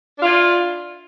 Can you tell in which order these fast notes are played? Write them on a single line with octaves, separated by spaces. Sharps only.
D4 F4 E4